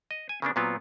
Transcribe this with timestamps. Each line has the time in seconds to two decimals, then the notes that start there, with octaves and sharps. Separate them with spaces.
0.11 D#5
0.29 G#5
0.42 C#3 A#3 B3 D4
0.56 A#2 F#3 B3 C4 F4